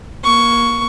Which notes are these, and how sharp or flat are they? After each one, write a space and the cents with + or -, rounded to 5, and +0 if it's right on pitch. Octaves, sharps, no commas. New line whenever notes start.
A#3 +25 C#6 +10